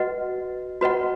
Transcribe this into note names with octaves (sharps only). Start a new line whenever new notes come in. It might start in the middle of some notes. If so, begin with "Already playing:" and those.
Already playing: F#4 B4 D#5 F#5
F#4 B4 D#5 F#5